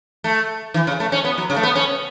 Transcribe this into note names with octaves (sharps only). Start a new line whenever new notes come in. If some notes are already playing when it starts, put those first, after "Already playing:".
A3
E3
C#3
A3
C#4
B3
F#3
C#3
A3
B3
C#4